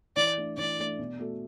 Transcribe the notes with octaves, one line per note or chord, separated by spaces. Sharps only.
E3 D5
A3 D4
E3 D5
A3 D4
B2
A3 F#4 A4